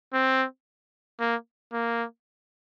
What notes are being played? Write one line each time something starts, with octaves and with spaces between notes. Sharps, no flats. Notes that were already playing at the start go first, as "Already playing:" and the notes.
C4
A#3
A#3